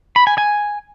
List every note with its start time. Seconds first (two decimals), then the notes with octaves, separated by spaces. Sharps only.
0.16 B5
0.27 G#5
0.38 G#5